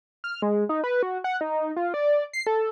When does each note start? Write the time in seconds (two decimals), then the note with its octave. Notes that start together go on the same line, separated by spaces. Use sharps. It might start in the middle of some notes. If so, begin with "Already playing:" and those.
0.24 F6
0.42 G#3
0.69 D#4
0.84 B4
1.03 F#4
1.24 F#5
1.41 D#4
1.76 F4
1.94 D5
2.33 C7
2.47 A4